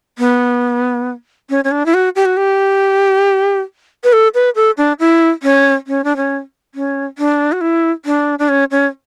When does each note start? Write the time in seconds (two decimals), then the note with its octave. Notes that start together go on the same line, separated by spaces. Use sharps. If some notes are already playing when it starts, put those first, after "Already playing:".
0.18 B3
1.50 C#4
1.64 C#4
1.71 D4
1.86 E4
1.94 F#4
2.15 G4
2.25 F#4
2.37 G4
4.04 B4
4.13 A4
4.34 B4
4.55 A4
4.77 D4
4.99 E4
5.43 C#4
5.87 C#4
6.04 D4
6.16 C#4
6.75 C#4
7.18 D4
7.52 F#4
7.61 E4
8.05 D4
8.39 D4
8.49 C#4
8.71 C#4